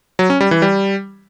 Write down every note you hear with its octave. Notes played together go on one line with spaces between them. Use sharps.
F#3
C#4
G3
E3
G3